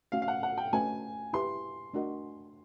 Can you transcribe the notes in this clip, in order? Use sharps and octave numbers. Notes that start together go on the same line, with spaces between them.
A3 C#4 F#4 F5
F5
F#5
F#5
G5
A3 C#4 F#4 B4 D#5 G#5
E4 G4 B4 C6
A3 D4 F#4 A#4 D#5